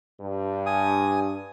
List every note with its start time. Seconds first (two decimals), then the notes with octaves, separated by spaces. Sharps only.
0.20 G2
0.66 G#5 D#6